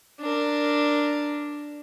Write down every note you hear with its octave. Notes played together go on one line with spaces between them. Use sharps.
D4 A#4